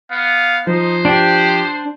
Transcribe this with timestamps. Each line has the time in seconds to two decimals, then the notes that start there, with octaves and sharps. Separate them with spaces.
0.11 B3 F5
0.67 F3 D#4 C5
1.05 D4 G4 G5